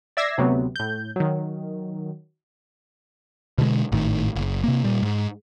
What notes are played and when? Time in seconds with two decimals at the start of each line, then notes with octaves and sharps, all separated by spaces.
0.17 D5 E5 E6 G#6 A#6 C7
0.37 D2 C3 F#3 B3
0.76 A2 G6
1.16 D#3 F#3
3.58 B2 D3 F3 G#3
3.92 G#1 A2 D#3
4.36 F#1
4.64 C3 A#3
4.84 A#2 G3
5.03 G#2